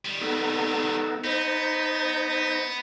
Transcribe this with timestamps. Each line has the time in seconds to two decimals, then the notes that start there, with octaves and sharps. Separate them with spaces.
0.05 D#3 G3
0.21 B3 D#4 A4
1.24 B3 D#4 C5 D#5